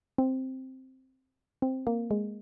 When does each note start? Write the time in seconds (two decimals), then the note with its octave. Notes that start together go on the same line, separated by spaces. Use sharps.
0.18 C4
1.62 C4
1.87 A#3
2.11 G#3